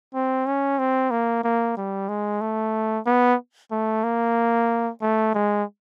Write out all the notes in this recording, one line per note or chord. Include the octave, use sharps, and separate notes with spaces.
C4
C#4
C4
A#3
A#3
G3
G#3
A3
B3
A3
A#3
A3
G#3